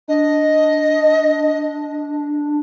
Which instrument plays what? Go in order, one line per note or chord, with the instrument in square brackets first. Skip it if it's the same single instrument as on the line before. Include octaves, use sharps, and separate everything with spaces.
[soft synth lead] D4 [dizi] D#5